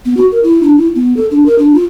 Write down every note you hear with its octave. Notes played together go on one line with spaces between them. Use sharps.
B3
F#4
A#4
E4
D4
E4
B3
A4
D4
A#4
D4
F4